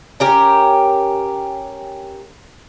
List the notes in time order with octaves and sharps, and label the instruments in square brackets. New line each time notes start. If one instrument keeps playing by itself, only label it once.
[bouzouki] C#4 G4 A#4